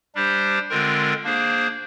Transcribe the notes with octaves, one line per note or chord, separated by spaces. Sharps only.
G3 D4 G4 C5
D3 G#3 C4 F4 A#4
A#3 D4 G#4 C5